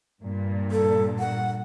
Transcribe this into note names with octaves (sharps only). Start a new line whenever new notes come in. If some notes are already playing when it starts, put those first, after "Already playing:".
G2 A#2
A4
F#5